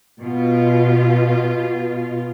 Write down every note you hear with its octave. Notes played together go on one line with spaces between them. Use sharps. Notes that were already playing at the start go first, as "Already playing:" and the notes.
B2 F4